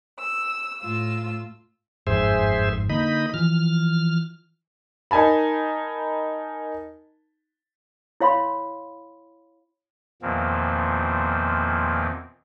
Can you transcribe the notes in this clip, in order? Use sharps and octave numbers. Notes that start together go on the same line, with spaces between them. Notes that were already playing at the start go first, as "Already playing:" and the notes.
E6
A2 F4 E6
G1 F2 G#2 G#4 C5 E5
D3 A#3 D#4 D#5 B5
E3 F3 F6
D#4 A#4 G#5 A5 B5
E4 C#5 F5 B5 C6
E2 A#2 D#3 F3 A#3 C4